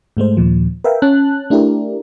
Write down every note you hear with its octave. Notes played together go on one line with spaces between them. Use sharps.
G#2 G#3 A3 C5
D#2 A#2 F3
A#4 B4 E5 F5 G5
C#4 A5 F#6
A3 D4 E4 G4 A#4